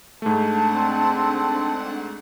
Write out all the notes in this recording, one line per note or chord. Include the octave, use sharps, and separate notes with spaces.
G#2 A3 D4 F#5 A5
C4